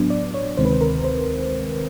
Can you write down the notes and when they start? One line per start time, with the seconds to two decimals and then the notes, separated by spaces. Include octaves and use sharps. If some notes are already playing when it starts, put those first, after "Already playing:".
Already playing: A2 F#3 B3 D4
0.10 D5
0.34 C#5
0.57 D2 C3 D#3 G#3 C4 C5
0.65 B4
0.73 C5
0.81 A#4
1.04 C5